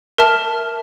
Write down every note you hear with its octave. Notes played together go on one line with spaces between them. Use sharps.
A#4 E5 A5 F6